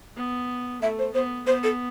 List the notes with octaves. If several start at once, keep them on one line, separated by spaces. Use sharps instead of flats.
B3
A3 E5
C5
B3 C5
B3 C5
A4